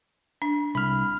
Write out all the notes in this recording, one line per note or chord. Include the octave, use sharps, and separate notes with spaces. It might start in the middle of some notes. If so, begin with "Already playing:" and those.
D4
C2 B5 F6